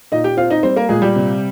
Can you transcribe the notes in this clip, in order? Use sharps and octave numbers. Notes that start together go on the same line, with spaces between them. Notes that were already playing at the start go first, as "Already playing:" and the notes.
A#2 D#4 D#5
G4 G5
C4 F4 F5
D#4 D#5
G3 C4 C5
A#3 A#4
A#2 G#3 G#4
G3 G4
C3